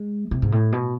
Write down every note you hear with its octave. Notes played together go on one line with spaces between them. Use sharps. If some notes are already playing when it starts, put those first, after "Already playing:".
Already playing: G#3
C3
G#2
A2
B2